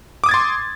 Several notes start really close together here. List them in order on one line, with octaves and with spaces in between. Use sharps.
D6 D#6 G#6 A6 C6